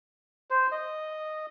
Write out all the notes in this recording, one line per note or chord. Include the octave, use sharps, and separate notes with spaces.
C5
D#5